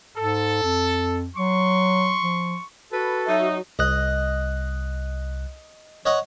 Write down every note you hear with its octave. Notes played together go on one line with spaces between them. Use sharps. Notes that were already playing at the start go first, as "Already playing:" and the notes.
G#2 A4
F2
F#3 C6 C#6
F3
F#4 A4 B4
F#3 D#4 E5
C2 D#5 F#6
C#5 D#5 F#5